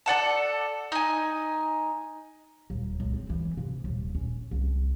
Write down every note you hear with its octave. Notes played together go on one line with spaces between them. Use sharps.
A4 D5 F#5 A5
D#4 G#5
D#1
C#2
C4
E3
C3
D#1
C#4
C2